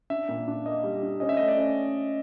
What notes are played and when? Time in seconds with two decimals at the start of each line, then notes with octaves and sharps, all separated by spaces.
0.10 D4 E5
0.29 A#2
0.48 D4
0.66 A#3 D#5
0.84 G3
1.02 D4
1.20 C#4 D#5
1.29 E5
1.37 A3 D#5
1.48 D5
1.57 C#4